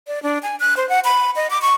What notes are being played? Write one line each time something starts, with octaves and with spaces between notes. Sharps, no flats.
D5
D4
G#5
F#6
C5
F#5
B5
D#5
D6
C#6